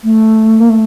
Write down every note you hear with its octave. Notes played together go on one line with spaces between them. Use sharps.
A3
A#3
A3